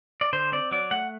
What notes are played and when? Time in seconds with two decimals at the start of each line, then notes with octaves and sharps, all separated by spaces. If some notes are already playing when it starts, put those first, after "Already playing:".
0.21 D5
0.33 D3 C5
0.52 C4 D5
0.71 F#3 D5
0.91 A3 F#5